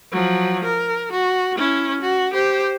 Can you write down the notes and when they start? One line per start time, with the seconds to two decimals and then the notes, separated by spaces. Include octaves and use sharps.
0.12 F3 F#3
0.64 A#4
1.12 F#4
1.57 C#4 E4
2.00 F#4
2.33 G4 C5